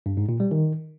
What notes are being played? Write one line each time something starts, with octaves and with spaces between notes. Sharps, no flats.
G2
G#2
A#2
G3
D#3